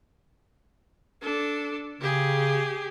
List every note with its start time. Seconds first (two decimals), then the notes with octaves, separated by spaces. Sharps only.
1.22 D4 A4
2.01 C#3 G4 G#4